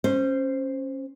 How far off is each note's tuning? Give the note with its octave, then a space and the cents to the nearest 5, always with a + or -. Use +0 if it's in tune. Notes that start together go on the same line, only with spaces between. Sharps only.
C#4 -20 C5 +0